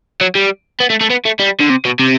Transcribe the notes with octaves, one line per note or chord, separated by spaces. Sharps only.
F#3
G3
B3
A3
A3
B3
A3
G3
D3
C3
B2
C3